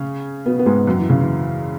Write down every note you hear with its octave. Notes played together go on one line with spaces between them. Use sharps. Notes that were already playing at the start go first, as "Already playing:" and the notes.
Already playing: C#3 C#4
B2 B3
B3
G#2 G#3
F#2 F#3
E3
C#3
E3